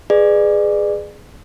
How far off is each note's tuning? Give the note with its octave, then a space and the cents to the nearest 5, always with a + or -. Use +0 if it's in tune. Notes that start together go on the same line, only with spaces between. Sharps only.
G#4 +0 B4 +0 D5 +35